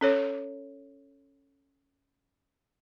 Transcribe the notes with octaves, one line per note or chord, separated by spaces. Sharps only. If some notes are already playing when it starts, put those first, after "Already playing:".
C#4 A4 C#5